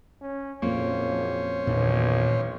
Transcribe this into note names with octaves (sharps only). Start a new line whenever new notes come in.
C#4
F#1 F2 A#2 A#3 C#4 C5 C#5
B1 E2 A#2 D#3 E3